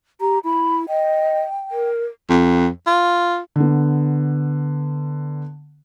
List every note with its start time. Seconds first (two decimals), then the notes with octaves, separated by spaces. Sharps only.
0.21 G4 A#5
0.44 E4 B5
0.88 D#5 G5
1.72 A#4
2.30 F2
2.87 F4
3.56 D3 B3